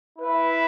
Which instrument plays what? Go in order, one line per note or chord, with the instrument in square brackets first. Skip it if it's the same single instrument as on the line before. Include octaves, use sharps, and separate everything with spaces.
[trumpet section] E4 B4 E5